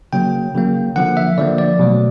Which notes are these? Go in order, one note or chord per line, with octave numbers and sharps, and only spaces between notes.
C#3 F#3 A#3 G5
C#3 F#3 A#3
D3 F3 A#3 F#5
E5
D3 F3 A#3 D5
D5
B2 F#3 A3